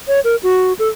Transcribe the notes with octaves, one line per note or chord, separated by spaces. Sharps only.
C#5
A#4
F#4
A4